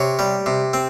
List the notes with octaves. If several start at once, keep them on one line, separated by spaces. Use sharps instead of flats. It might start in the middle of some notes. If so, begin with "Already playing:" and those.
Already playing: C3 C#5
G3
C3
C4